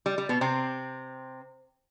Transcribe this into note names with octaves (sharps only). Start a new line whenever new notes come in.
G3
G3
B2 B3
C3 C4